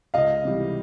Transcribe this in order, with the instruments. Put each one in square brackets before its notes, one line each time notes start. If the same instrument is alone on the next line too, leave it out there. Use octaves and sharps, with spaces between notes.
[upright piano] C#2 D#5 F5
C3 E3 G3